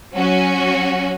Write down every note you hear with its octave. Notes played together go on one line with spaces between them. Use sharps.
F#3 C#4 F#4